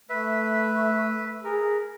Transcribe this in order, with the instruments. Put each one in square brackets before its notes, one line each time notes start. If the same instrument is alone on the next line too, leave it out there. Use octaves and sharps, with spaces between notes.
[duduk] A3 [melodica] B4 E5
[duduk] G#4 [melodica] A#4